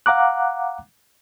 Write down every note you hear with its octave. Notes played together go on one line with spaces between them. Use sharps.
F5 F#5 A#5 D6 F#6